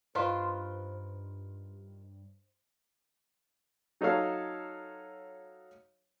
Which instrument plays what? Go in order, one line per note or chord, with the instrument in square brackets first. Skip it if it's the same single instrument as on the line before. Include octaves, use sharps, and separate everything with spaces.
[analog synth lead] G2 [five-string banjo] D#3 F4 B4 [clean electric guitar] C5
[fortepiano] F#3 D#4 A4 C#5 F5